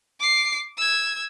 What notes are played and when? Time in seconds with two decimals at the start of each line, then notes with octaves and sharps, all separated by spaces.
0.20 D6 C7
0.77 E6 G#6